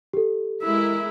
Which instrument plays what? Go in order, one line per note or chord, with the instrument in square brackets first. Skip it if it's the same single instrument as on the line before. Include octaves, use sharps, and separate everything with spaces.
[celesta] G4 A4
[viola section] G#3 E4 A#4 [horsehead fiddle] E5